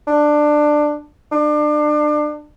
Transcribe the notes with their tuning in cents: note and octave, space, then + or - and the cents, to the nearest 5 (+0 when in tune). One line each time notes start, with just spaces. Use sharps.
D4 +15
D4 +30